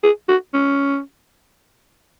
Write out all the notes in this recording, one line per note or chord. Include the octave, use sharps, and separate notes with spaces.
G#4
F#4
C#4